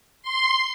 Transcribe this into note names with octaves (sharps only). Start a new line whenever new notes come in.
C6